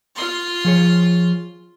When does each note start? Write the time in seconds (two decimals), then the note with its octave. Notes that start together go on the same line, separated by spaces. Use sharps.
0.15 F4 C6
0.65 F3 G#4 C#5